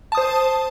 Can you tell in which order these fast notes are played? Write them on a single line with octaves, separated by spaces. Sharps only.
A5 D#6 C5